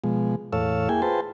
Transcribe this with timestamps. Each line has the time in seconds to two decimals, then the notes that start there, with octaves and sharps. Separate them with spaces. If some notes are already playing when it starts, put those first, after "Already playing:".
0.04 B2 F3 G#3
0.53 E2 A2 A4 C#5 F5 E6
0.89 A#3 E4 G#4 G5 G#5
1.02 F4 G#4 B4 C5 G5 A5